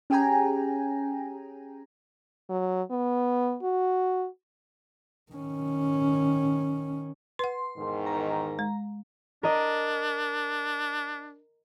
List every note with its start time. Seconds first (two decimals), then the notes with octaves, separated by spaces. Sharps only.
0.10 C#4 G4 G#4 G5 G#5 A#5
2.50 F#3
2.91 B3
3.63 F#4
5.32 D#3 C#4
7.39 B4 F#5 C6
7.77 E2 G#2 D#3
8.06 A#5
8.59 G#3
9.43 D4 A#4 D#5